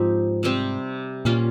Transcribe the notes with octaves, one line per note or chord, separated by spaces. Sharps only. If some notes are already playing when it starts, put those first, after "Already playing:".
Already playing: G#2 F3 C4 D#4 G4
C3 G3 C4 G4
A#2 G3 A#3 C#4 F4